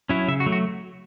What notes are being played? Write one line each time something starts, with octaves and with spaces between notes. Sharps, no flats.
F#3 C#4 E4
C#3 E5
F#4
F#3 A3
F#4